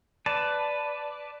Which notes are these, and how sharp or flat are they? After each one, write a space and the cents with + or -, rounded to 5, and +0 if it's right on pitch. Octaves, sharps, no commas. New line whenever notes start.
B4 +10 D5 +0 A5 +0